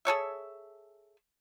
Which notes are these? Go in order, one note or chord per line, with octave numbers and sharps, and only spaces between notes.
G#4 A4 C#5 E5